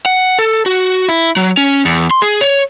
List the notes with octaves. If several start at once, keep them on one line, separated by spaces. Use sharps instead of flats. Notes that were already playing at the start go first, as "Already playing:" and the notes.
F#5
A4
F#4
E4
F#3
C#4
E2
C6
G#4
C#5